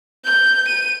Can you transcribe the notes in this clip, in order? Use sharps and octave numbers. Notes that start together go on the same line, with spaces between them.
G6
D#7